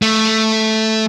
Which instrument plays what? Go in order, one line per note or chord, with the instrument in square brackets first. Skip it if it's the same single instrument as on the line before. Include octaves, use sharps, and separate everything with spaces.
[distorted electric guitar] A3